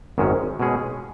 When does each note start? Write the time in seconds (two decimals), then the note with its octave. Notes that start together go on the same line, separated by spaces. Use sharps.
0.18 G#1 F#2 D#3 G#3 C#4
0.60 B2 G#3 C#4 G#4